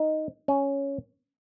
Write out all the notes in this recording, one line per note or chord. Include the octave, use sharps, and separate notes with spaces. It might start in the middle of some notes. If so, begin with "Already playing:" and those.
Already playing: D#4
C#4